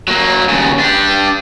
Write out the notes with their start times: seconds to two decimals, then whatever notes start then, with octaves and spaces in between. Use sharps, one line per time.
0.08 F#3 A#3
0.49 D#2 C#3
0.79 D4 G4